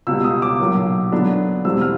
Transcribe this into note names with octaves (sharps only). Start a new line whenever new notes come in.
C#2 B2 G3 E6
D#6
D6
B1 A#2 F#3 A#3
F#2 D3 F#3 B3 D4
E2 B2 G3 C4 E6
F6